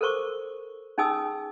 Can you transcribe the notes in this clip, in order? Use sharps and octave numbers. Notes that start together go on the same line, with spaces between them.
A4 A#4 C5 C#6 D6
C#4 D#4 G#4 G#5 D#6 E6